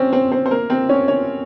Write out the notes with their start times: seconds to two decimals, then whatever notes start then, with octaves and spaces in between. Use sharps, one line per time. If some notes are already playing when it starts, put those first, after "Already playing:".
Already playing: C4 C#4 C5
0.13 C4 C5
0.32 C4 C5
0.46 C5
0.51 A#3 A#4
0.70 C4 C5
0.89 C#4 C#5
1.08 C#4 C#5